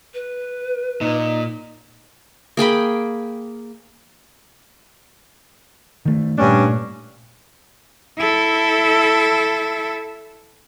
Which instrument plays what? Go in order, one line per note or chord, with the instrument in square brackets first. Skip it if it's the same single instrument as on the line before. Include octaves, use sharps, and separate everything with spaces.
[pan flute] B4
[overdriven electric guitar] A#2 [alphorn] D#4
[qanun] A#3 G#4 G5 B5
[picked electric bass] D#3 A3
[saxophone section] G2 C#4 D4 [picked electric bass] A#2 A3
[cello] E4 A4